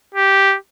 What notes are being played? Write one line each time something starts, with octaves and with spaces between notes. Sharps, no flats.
G4